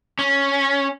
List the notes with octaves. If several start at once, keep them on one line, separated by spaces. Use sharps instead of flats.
C#4